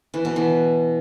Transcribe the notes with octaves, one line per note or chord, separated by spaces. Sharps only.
E3
B2
E3